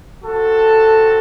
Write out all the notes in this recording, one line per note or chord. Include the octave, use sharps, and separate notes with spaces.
C4 F#4 A4